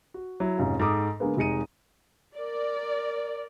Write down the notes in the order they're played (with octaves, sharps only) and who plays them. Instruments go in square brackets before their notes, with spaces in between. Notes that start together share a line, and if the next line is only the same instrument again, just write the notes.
[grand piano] F#4
F#3 E4
F1 G#2 C#4 F4
G#2 A4 D6 D#6
D3 G#3 A#3 B3
F1 G#3 D#4 C#7 D#7
[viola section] A#4 D5